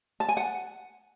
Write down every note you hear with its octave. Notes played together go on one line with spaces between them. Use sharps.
A5
G#5
F#5